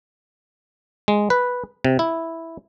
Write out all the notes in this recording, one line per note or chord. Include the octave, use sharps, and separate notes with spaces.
G#3
B4
C3
E4